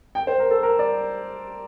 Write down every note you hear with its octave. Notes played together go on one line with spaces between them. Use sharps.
G5
C5
A#4
A4
A#4
D5